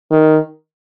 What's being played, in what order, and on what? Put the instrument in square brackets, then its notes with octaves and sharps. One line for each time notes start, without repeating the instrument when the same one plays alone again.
[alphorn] D#3